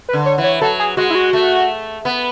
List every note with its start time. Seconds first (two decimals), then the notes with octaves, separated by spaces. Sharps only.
0.09 B4
0.13 D3
0.26 C#5
0.38 E3
0.44 C#5
0.61 F#3 A4
0.80 G#4
0.97 G#3 F#4
1.10 E4
1.15 F#4
1.33 A3
2.05 B3